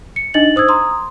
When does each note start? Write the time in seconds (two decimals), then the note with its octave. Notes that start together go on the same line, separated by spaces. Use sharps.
0.16 C#7
0.34 D4 D#4 D#5 A6 F#7
0.56 C5 D#6 E6 G#6
0.68 A#5 C6 D#6